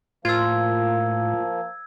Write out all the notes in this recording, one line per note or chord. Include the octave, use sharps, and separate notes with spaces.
A2 F3 A#3 F4 E6 G#6